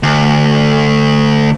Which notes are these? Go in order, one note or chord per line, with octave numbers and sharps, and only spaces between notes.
D2